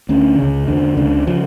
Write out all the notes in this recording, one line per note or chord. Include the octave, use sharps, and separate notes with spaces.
D2 D3 C#4
C#2 C#3
E2 D3 D4
C#2 C#3 D4
C#3 F3